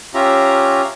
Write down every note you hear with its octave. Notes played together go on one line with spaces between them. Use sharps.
C#4 F4 G4 E5 A#5